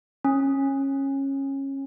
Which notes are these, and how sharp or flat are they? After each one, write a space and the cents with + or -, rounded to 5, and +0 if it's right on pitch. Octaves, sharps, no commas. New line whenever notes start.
C#4 -20